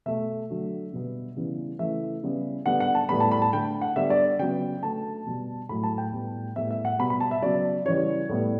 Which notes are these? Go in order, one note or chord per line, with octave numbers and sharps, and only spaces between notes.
B2 A3 E5
D3 F#3 A3
B2 G3 B3
C#3 E3 G3 B3
C#3 E3 A3 E5
C#3 G3 B3
D3 G3 B3 F#5
F#5
A5
A2 G3 B3 B5
A5
B5
A5
D3 A3 G5
F#5
D3 G3 B3 E5
D5
C#3 F#3 B3 G5
D3 A3 A5
B2 G3 B3
A2 F#3 A3 B5
A5
G5
A2 G3 B3
A2 G3 B3 E5
E5
F#5
B2 G3 B3 B5
B5
A5
E5
C#3 F#3 B3 D5
C#3 E3 G3 C#5
A2 G3 B3